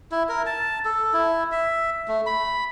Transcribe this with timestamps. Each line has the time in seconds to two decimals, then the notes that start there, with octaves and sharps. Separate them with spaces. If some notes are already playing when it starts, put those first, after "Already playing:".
0.11 E4
0.29 A#4
0.46 A5
0.85 A4
1.13 E4
1.52 E5
2.08 A3
2.26 B5